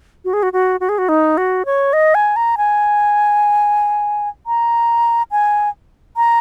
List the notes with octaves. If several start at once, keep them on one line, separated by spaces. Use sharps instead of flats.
F#4
G#4
F#4
F#4
F#4
G#4
F#4
D#4
F#4
C#5
D#5
G#5
A#5
G#5
A#5
G#5
A#5